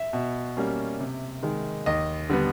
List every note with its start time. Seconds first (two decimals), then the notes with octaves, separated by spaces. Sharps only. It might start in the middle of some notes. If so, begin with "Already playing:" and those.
Already playing: E5
0.13 B2
0.57 G3 A#3 C#4
1.00 C3
1.43 D#3 G#3
1.86 D#2 D#5
2.29 D3 G3 B3